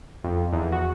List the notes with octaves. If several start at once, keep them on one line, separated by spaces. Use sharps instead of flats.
F2
E2
F#4